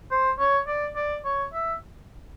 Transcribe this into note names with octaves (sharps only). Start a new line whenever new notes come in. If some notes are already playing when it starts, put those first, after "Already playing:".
C5
C#5
D5
D5
C#5
E5